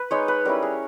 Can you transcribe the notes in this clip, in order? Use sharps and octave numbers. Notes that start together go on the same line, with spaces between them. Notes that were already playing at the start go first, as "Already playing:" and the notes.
Already playing: B4
G#3 D#4 C#5
B4
G3 C#4 E4 A#4
G#4